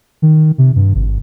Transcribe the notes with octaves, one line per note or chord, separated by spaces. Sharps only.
D#3
C3
G2
G#1